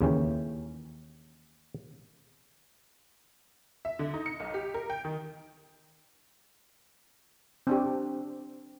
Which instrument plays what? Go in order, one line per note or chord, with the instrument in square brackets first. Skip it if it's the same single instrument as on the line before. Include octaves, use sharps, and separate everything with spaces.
[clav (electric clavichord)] D#2 C#3 E3 C#4 G5
[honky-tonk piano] E5
D3
D#4
C#7
B1
G4
A#4
G5
D#3
[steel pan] C4 D4 G4